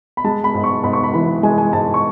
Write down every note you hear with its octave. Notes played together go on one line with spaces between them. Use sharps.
B5
G#3 A5
B5
G#2
C#6
G#2 B5
C#6
B5
E3 B5
G#3 G#5
G#5
G#2 A5
C#6